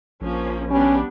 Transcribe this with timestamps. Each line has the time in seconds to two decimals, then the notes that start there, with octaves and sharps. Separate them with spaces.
0.21 A#1 F3 A#3 C#4
0.70 G3 B3 C#4 D4